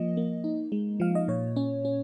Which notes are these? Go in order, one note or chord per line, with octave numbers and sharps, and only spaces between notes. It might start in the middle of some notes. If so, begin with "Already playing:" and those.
Already playing: F3 A#3 D#5
A#3
D#4
G#3
F3 F5
D#5
A#2 C#5
C#4
C#4